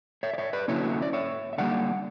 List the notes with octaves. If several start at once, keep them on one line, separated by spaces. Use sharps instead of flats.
C#5 E5
D5
C#5 E5
B4 D5
D3 F#3 A#3 C#4 E4 C#5 E5
D5
C#5 E5
E5
D3 G3 A#3 D5 F#5